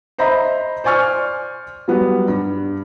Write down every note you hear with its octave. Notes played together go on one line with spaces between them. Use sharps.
C5 D#5 E5 A#5 B5
C5 D5 G#5 C#6 F6
F#3 G3 B3
G2